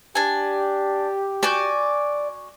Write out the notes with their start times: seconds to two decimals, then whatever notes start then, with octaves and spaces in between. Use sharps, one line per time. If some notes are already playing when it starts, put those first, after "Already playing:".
0.15 D4 G4 G#5
1.43 F#4 D5 G#5 G6